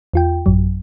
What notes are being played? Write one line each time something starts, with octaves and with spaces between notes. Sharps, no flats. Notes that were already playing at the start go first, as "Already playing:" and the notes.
E2 F4 G5
A1 F#2 F#3